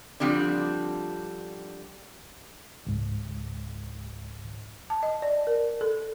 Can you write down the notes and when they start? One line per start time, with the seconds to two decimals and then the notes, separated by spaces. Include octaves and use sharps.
0.20 D3 F3 G3 C4 D4
2.87 C#2 G#2
4.90 A5
5.03 D#5
5.22 D5
5.47 A#4
5.81 A4